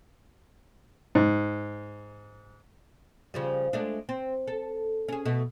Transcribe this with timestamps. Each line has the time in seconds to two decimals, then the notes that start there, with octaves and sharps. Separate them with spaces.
1.15 G#2
3.34 C#3 F3 G3
3.73 G#3 A3 D4
4.09 C4
4.47 A4
5.08 C#4 G#4
5.25 B2 A3